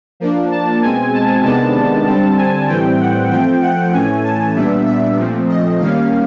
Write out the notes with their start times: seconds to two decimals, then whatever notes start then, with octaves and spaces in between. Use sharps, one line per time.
0.20 F3 A#3 D4
0.51 A5
0.82 B2 G#3 C4 G#5
1.13 A5
1.44 C3 D#3 G#3 B3 D4 A5
2.06 D3 G3 C4
2.38 G#5
2.69 A2 E3 G3 C4 G5
3.00 F#5
3.30 F3 A3 C4 G5
3.62 F#5
3.93 A2 E3 A3 C#4 G#5
4.24 A5
4.55 A#2 G3 B3 D4 E5
4.86 E5
5.18 A#2 F3 A3 C4
5.49 D#5
5.80 D#3 G3 A#3 C#4 F5